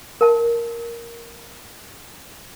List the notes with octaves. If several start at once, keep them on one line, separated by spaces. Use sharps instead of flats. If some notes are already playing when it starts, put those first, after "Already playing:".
A#4 A5